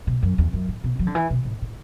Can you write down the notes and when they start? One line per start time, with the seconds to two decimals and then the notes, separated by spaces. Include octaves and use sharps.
0.07 B2
0.23 F#2
0.38 E2
0.53 F#2
0.68 A2
0.84 B2
0.99 F#3
1.07 D3
1.15 E3
1.30 B2
1.45 A2
1.62 A2